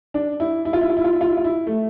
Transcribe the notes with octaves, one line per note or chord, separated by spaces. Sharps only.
D4
E4
E4
F4
E4
F4
E4
F4
E4
F4
E4
F4
E4
A3